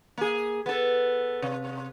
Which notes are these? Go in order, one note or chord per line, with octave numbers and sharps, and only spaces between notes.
A#3 G#4
B3 A4
C3